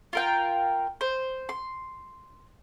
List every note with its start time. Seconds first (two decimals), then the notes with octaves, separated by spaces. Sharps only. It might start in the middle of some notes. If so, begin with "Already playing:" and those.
0.13 F4 A#4 G5
1.01 C5
1.49 C6